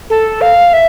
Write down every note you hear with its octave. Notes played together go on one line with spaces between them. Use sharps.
A4
F5
E5